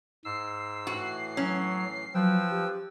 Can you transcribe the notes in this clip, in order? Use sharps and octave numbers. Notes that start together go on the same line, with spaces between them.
G#2 E6 C7
A2 E3 F#4
F#3 C#4
F3 F#3 B4 G5 E6
G4